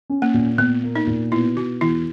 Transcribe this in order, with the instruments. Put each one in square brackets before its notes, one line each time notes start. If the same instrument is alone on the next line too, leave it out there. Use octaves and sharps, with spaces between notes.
[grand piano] C#4
[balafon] A#3
[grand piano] A#2
[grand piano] A#2 [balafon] B3
[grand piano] A#3
[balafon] D#4
[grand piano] A#2
[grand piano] B2 [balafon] E4
[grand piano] B2 [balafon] F#4
[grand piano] E2 [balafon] E4